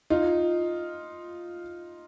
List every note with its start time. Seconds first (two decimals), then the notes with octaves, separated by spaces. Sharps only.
0.10 D#4 F4